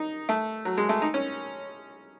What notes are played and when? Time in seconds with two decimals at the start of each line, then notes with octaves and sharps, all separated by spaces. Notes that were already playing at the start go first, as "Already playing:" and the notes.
Already playing: D#4
0.29 A3
0.65 F#3
0.78 G#3
0.89 A3
1.02 D#4
1.14 C#4